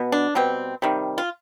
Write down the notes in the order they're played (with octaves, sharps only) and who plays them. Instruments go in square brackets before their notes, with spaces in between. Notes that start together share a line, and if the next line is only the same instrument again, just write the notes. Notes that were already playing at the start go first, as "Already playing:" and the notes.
Already playing: [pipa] B2 B3
D4
B2 G3 C4
C3 D#3 G3
F4